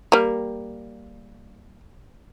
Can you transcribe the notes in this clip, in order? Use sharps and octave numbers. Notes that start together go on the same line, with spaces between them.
G3 A#3